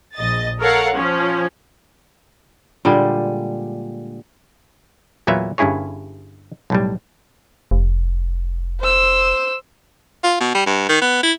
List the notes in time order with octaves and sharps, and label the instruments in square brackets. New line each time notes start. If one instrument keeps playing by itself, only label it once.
[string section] A#1 D#5 A6
A4 A#4 C#5 F5 F#5
F3 C#4
[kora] A#2 D3 G3 G#3
[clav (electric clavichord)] E2 A#2 F#3 B4 E5 F5
G1 G2 C#4 E4 G#4 C#5
B1 A2 G3
[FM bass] F1
[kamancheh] C5 E6
[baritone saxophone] F4
B2
G3
G2
D#3
B3
E4